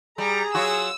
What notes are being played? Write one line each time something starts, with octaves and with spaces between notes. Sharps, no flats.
G3 G#4 A#5
F#3 F4 F#4 E6